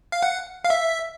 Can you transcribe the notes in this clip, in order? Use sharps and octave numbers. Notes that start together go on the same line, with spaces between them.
F5
F#5
F5
E5